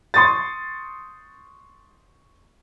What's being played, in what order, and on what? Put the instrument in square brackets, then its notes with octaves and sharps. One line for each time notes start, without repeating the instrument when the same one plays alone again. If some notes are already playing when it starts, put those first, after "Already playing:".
[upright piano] C6 C#6 D#6 A6